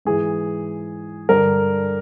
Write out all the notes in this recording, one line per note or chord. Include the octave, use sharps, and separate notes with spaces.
G#2 E3 G#4
G2 D3 A#4